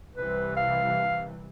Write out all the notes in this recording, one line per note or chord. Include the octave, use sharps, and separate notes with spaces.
C2 C3 E3 B4
F5